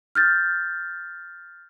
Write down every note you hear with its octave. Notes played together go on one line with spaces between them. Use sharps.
F6 G6 A6